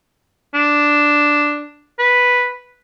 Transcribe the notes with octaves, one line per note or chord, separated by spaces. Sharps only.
D4
B4